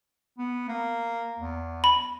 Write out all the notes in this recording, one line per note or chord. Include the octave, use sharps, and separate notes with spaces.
B3
A#3
E2
B5